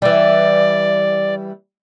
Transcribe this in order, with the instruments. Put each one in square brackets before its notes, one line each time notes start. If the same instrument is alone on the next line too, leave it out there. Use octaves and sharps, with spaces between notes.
[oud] E3 G3 [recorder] D5